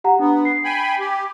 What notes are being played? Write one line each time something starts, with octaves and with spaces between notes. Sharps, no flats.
G4 F#5 A#5
B3 D4
C7
G5 G#5 B5
G4